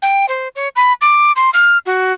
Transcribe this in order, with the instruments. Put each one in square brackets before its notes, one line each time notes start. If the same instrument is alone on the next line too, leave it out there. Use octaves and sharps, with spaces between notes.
[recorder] G5
C5
C#5
B5
D6
C6
F6
F#4